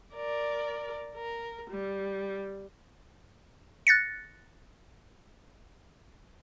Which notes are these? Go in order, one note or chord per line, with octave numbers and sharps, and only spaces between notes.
A#4 D5
A#4
G3
F#6 A6 A#6 C#7